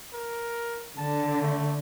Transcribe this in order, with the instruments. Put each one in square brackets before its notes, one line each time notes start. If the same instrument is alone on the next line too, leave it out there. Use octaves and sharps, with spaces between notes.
[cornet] A#4
[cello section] D3 [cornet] A5
[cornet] A3